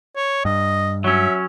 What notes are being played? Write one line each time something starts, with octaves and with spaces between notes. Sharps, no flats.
C#5
G2 D#5
F#3 C#4 E5